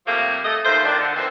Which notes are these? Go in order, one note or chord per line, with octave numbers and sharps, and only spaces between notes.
C3 F3 G3 A3 A#3
A3 D#5
D#2 A3 F4 C5
A#2 D#3 D4
D3
A#2 D#3 E3 C4